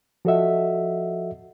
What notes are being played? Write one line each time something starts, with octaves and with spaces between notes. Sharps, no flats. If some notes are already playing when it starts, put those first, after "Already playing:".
F3 F#4 A4 D#5 E5 F#5